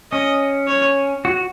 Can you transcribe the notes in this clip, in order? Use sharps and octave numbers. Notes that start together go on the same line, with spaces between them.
C#4 D#5
C#5
F#4